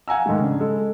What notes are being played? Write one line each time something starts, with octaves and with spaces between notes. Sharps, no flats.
F5 F#5 G#5 A#5 E6
G#2 D#3 G#3 A3
C#3 D4
G#3 A4